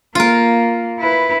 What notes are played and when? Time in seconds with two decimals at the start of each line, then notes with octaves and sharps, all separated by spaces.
0.15 A#3 F4 A#4
1.00 E4 B4